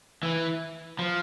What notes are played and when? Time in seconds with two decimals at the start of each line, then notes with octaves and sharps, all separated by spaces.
0.23 E3
0.99 F3